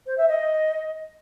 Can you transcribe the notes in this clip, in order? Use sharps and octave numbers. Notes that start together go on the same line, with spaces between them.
C5
E5
D#5